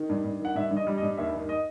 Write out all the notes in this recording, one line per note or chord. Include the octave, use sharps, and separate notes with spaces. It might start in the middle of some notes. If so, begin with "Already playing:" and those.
Already playing: D#3
G2
G2
D#3
F#5
G2 E5
G2
D#5
G3
D#5
G2
D#2 E5
D#3
D#5